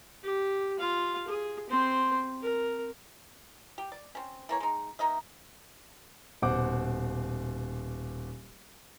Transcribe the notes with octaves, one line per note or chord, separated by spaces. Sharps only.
G4
F4 F5
G#4
C4 C5
A#4
G4
D5
C4 C#4
E3 A#3 C#5
G#3 D#4
A#3 D#4 D#5 E5
D#1 B2 C5 F#5 D6